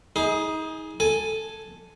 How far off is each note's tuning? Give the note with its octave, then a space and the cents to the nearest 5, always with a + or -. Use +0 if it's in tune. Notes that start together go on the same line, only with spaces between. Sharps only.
D#4 +35 G#4 +0
A4 +0 G#5 +0